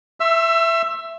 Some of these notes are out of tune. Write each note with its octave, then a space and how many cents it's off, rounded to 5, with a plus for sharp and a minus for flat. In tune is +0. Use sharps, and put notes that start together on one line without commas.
E5 +10 C6 +45 E6 +30